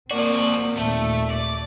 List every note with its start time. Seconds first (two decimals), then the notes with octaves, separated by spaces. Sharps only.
0.11 F3 A#3 C4 F#4 D5
0.77 D#2 A#2 A3
1.30 D5